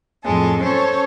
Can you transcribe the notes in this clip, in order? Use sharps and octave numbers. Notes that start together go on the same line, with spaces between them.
F2 A2 G#3 A4
C#4 A4 C5 C#5